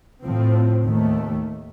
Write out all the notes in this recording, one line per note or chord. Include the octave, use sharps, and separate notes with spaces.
A2 F3 C4
D#2 D#3 A3